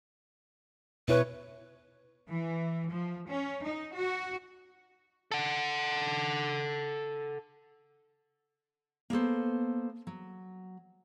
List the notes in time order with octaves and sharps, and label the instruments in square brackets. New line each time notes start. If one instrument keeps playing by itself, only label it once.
[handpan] B2 E4 C#5 [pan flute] B4
[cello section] E3
F3
C#4
D#4
F#4
[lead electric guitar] A4 F#5
[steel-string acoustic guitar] A#3 B3 A4 C5
F#3